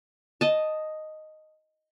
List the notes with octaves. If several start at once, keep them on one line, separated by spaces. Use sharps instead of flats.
D#5 A5